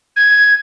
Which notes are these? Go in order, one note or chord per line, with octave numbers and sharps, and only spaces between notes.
G#6